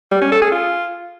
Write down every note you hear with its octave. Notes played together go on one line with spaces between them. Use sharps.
G3
C#4
A4
G#4
F4